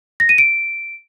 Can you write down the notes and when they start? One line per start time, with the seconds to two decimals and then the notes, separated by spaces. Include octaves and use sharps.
0.20 A#6
0.29 D#7
0.38 D7